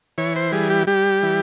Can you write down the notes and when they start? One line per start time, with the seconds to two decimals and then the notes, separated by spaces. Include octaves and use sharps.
0.18 E3 C#5
0.36 C5
0.52 G3 G#4
0.70 G4
0.87 G3 G4
1.23 E3